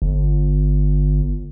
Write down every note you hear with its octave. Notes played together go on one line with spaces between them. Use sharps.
G1